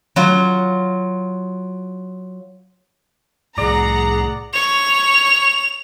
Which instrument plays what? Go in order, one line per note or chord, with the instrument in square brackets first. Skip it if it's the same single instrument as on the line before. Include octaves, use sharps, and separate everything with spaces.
[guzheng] F#3 F4
[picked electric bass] C2 A2 [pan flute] G#4 [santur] D5 [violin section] F#5 A#5
[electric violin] C#5 [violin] F7